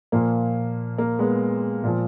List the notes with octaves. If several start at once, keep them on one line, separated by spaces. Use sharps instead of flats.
A#2 F3 A#3
A#3
G#3 B3
A#2 F3